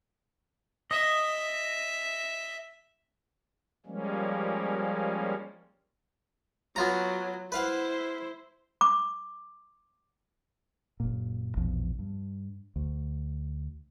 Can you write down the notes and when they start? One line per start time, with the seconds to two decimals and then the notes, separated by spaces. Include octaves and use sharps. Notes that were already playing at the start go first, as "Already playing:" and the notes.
0.91 D#5 E5
3.86 F3 G3 G#3 A#3 C#4
6.76 F#3 B3 F4 A#5
7.52 E4 B4 C5 F5 F#5
8.81 D6
11.00 F#1 A#2
11.57 A#1 E2 B2 F3
11.99 G2
12.76 D2